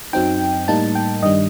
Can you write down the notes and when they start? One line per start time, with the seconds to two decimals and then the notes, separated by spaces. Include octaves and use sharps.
0.13 F#2 F#3 C4 D#4 G5
0.68 A2 G3 A#3 D#4 A5
0.95 G5
1.23 G2 D#3 G3 D4 D#5